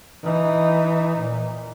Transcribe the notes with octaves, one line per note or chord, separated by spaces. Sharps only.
E3 D#4
A#2